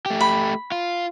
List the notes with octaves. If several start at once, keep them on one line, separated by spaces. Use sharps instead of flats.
A3 G4
B5
F4